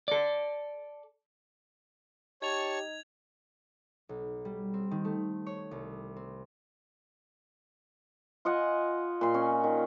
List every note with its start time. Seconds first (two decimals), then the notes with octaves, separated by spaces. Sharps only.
0.08 A4 D5
2.42 D#4 G4 C#5 A5 C#6 G#6 F7
4.09 B1
4.45 G3
4.74 C4
4.91 D#3
5.05 A3
5.46 C#5
5.71 C2
6.16 C4
8.45 F4 D#5 F#5 G#5
9.21 A#2 C6
9.34 C#4
9.64 D#3